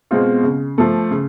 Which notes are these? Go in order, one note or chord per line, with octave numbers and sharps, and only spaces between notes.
B2 G#3 C4 F4
C#3
F3 A3
C#3